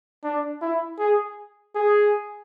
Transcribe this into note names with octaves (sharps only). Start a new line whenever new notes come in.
D4
E4
G#4
G#4